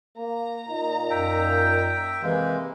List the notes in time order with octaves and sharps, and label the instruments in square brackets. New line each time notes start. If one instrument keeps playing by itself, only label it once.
[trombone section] A#3 [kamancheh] A#5
[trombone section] A#2 D#4
[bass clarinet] F#2 [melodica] E5 G5
[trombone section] C3 A#3 [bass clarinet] E3 [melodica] G#3